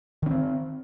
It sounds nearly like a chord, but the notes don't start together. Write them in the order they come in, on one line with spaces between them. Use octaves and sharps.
D#3 C#4 C4